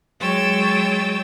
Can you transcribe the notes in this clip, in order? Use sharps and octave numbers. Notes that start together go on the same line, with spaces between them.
F#3 G#3 C#5 G5 E6 A6